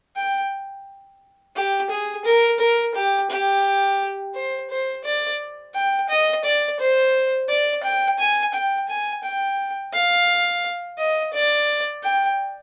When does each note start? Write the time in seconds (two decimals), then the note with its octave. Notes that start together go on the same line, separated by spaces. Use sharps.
0.16 G5
1.56 G4
1.90 G#4
2.25 A#4
2.60 A#4
2.95 G4
3.31 G4
4.35 C5
4.70 C5
5.05 D5
5.75 G5
6.09 D#5
6.45 D5
6.80 C5
7.49 D5
7.84 G5
8.19 G#5
8.54 G5
8.89 G#5
9.24 G5
9.93 F5
10.98 D#5
11.34 D5
12.03 G5